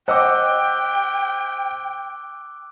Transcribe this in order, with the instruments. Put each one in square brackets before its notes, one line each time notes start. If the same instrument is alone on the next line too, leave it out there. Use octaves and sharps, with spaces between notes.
[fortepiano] C5 D#5 F#5 [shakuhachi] G5 [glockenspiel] D6 E6 F#6